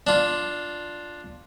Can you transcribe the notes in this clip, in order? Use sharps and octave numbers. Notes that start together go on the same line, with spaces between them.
D4 F4